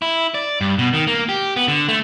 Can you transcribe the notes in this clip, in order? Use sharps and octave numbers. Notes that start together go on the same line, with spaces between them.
E4
D5
G2
B2
D#3
A#3
G4
B3
D3
A3